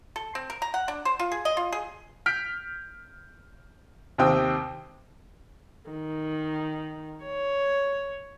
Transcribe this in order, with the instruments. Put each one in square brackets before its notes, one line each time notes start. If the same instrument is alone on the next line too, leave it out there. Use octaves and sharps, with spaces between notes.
[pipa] A4
C4
A#4
A#5
F#5
D4
C5
F4
G#4
D#5
F4
G#4
[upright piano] F6 G6 B6 D7
D#2 C3 C4 G5 D#6 E6
[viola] D#3
C#5